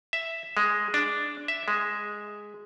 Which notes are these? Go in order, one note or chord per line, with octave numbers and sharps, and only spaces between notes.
E5
G#3
D4
E5
G#3